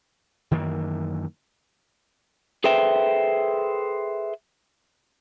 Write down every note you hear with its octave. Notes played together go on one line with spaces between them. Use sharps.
F#2 D#3 E3 A#3
G#4 A4 B4 C5 E5 G5